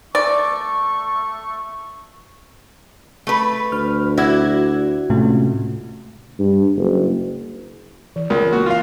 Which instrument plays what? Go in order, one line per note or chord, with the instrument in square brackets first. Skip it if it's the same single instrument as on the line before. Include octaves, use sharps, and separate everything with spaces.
[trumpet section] A3 C#6 [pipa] D5
[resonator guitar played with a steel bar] A3 B4
[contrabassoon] D2 [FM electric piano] F6
[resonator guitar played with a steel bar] E4 F#4 [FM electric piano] D5 G#6
[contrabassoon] C#2 [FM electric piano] A2 C3 A3
[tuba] G2
F#1
[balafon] E3
[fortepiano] C#2 [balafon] A#4
[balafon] A#3 [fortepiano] F#4
[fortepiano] F4 F5